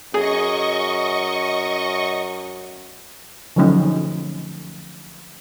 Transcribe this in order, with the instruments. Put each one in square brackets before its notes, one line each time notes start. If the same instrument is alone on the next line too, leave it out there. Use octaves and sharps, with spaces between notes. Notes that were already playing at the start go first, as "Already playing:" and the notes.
[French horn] F#2 [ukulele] G#4 [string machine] D#5 C#6
[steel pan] D3 F3 F#3 A3 C#4 D#4